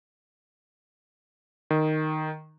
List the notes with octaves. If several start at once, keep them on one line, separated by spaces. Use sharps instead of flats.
D#3